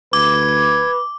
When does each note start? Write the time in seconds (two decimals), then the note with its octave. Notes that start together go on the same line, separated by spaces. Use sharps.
0.13 D2 B4 D6 G#6